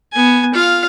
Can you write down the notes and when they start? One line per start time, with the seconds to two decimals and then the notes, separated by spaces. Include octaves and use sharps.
0.13 B3 G#5
0.54 F4 F5